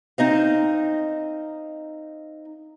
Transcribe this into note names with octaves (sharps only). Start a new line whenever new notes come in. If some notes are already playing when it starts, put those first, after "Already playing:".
C4 D#4 D#5 F5